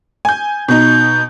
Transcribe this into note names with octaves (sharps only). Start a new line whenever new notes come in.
G#5 G6
B2 D#4 G6